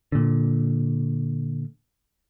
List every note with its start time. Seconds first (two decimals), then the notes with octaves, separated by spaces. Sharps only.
0.12 A#2 D3